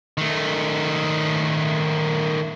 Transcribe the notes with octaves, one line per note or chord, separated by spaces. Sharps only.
D#3 A3